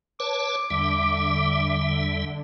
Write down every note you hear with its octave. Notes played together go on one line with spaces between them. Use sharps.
B4 C#5 A5 D6
E2 D3 G3 E5